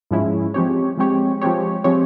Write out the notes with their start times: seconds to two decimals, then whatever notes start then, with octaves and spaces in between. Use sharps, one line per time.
0.11 G#2 F3 G#3 C#4 E4
0.54 F3 G#3 C4 G4 C#5
0.98 F3 G#3 C4 G4 C#5
1.41 F3 G#3 C4 G4 C#5
1.84 F3 G#3 C4 G4 C#5